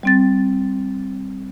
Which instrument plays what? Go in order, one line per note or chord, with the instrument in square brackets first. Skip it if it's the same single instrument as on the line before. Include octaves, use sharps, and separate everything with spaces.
[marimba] G3 C4 A6